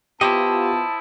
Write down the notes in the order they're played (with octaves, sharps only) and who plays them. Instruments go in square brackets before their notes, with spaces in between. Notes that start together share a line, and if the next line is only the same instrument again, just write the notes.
[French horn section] B3 F4 [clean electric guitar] E4 C5 D#5 [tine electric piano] G4 [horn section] A5